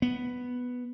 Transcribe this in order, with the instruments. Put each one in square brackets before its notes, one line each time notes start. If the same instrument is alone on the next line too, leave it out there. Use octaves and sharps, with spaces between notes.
[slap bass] B3